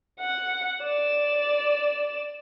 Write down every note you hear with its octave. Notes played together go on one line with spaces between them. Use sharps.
F#5
D5 E7